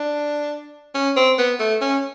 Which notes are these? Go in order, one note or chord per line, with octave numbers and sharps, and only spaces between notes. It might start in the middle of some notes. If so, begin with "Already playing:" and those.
Already playing: D4
C#4
C4
B3
A3
C#4